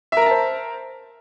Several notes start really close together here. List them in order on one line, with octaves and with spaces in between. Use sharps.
E5 A#4 A#5 A5 C5